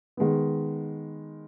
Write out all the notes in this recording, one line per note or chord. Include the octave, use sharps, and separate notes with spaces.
D#3 G#3 B3